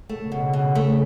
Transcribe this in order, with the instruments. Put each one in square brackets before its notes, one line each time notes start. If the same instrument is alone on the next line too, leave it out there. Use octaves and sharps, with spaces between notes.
[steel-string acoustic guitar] A3
[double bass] C#3
[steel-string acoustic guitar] B2
B2
A3